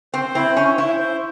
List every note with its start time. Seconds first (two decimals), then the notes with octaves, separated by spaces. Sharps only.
0.14 C4 C5
0.35 C4 E4
0.56 C#4 C5
0.77 E4 C5
0.99 C5